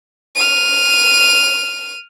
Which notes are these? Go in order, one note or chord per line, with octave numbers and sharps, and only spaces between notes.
F6 D#7